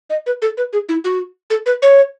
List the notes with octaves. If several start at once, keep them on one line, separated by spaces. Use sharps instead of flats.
D#5
B4
A4
B4
G#4
E4
F#4
A4
B4
C#5